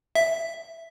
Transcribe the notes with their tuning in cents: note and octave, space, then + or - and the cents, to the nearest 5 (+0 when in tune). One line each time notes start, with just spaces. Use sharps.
E5 +5